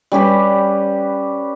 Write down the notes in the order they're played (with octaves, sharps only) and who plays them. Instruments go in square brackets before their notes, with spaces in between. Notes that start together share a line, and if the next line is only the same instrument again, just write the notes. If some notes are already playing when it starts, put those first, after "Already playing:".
[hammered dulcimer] G3 C#4 G4 B4